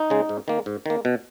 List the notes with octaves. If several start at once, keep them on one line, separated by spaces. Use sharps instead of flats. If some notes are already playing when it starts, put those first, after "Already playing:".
Already playing: D#4
C#3 G#3
G#2
D#3 A#3
G#2
D#3 A#3
B2